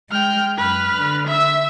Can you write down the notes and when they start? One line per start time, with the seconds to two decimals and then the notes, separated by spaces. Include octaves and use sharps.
0.11 G#3 G5 F6
0.58 F#2 B4 F6
0.94 D3
1.27 E5 E6